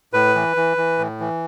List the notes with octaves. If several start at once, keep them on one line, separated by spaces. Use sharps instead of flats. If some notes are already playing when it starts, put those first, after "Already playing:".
A2 B4
E3
E3
E3
A2
E3